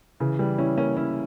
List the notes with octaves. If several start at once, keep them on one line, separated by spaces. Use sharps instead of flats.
C#3 E3
E3 G3
C#4 E4
A#3 C#4
C#4 E4